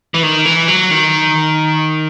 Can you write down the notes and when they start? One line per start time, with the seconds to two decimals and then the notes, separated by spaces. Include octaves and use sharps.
0.14 E3
0.23 D#3
0.45 E3
0.68 F#3
0.91 D#3